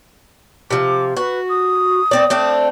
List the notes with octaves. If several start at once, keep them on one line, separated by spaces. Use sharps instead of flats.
C3 F3 D6
F#4 B4
D#6
A3 C4 D5
A3 C4 D4